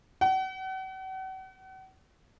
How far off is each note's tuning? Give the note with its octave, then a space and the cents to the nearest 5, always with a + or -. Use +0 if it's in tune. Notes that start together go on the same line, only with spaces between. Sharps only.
F#5 +40